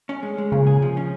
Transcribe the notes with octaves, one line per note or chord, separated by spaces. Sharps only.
C#4
G#3
G#3
A#2 C#3
G#4
F3
C#4